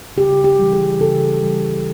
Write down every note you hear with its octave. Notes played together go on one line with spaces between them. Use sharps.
C#3 G4
G4
E3 G3
G#4
C#3 A4
E3 G3